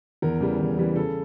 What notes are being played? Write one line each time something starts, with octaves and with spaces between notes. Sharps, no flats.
E2 A#4
C#3 E3 G3
E2
C#3 E3 G3
C#3 A4